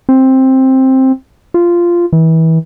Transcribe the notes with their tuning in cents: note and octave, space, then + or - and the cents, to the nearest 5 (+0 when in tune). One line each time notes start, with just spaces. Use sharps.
C4 +10
F4 -10
E3 -30